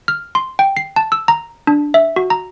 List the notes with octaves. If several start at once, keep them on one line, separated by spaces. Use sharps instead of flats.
F6
C6
G5
C7
A5
E6
A#5
D4
E5
F#4
A#5